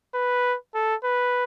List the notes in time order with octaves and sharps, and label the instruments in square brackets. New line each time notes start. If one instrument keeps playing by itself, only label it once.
[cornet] B4
A4
B4